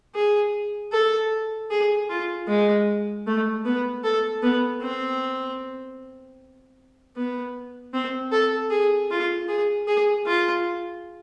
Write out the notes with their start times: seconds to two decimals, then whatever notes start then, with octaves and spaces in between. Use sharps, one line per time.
0.14 G#4
0.92 A4
1.71 G#4
2.09 F4
2.48 G#3
3.27 A3
3.65 B3
4.03 A4
4.43 B3
4.81 C4
7.16 B3
7.93 C4
8.32 A4
8.70 G#4
9.10 F4
9.48 G#4
9.87 G#4
10.26 F4